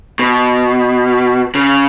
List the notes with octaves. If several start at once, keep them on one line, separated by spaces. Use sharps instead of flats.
B2
C#3